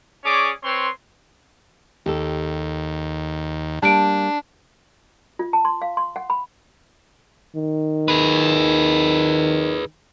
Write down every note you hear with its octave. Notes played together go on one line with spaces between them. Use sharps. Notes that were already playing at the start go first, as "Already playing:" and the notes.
C#4 G#4 C#5 D5 D6
C4 B4 C#5 C6
D#2 G4 A4
G3 A#3 D4 A5 D7
F4
A5
C6
F5
C6
F#5
B5
D#3
G#4 B4